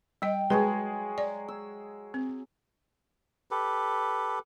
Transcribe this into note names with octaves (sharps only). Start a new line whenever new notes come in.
G3 D#5 G5
F#3 G#3 G#4 B4 C#5
D5
E6
C4
G4 A4 B4